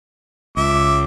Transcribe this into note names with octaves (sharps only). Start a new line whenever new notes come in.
C#2 E5 D6